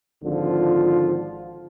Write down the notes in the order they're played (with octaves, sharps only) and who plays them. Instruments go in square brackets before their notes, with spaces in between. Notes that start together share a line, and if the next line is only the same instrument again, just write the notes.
[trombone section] G#1 D3 F3 F4